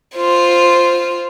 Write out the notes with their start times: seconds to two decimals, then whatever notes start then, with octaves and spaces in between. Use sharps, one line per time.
0.16 F4 C5